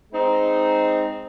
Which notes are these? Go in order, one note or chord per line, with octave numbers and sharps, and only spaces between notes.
G#3 C4 D#4